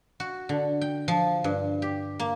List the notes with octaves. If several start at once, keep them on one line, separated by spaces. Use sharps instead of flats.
F#4
D3
G5
F3
G2
G4
A#3